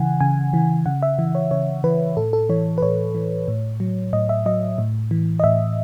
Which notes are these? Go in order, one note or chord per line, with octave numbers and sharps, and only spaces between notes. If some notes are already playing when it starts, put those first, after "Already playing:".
Already playing: C#3 E3 F#5 G#5
C#3 G#5
E3
C#3 F#5
E5
E3
C#5
C#3 C#5
E3 B4
A2 A4
A4
E3 C#5
B4
A2 C#5
E3
A2
F#3
A2 D#5
E5
F#3 D#5
A2
E3
D#5
A2 E5